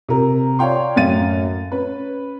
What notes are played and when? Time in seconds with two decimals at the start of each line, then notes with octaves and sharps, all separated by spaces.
0.09 C3 A#4
0.59 C#5 D5 F5 G5 C6
0.96 F#2 A2 C#4 F5 A6 D#7
1.72 C#4 B4